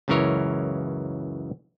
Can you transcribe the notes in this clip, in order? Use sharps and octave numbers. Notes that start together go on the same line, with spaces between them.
C#2 F#2 C#3 E3 A#4 C#5